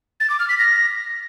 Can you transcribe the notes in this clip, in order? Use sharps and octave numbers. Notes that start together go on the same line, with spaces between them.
A6
D6
F6
B6
A#6